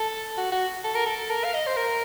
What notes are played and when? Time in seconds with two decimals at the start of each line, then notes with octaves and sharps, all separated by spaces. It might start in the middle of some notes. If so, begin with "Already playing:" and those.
Already playing: A4
0.38 F#4
0.52 F#4
0.84 A4
0.95 A#4
1.06 A4
1.30 A#4
1.44 F5
1.54 D#5
1.67 C5
1.77 A#4